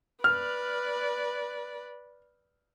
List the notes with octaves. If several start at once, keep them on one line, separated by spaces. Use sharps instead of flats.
B4 D5 F6